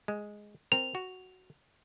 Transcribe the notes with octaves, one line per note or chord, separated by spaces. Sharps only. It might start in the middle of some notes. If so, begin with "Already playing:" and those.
G#3
C4 A#4 F7
F#4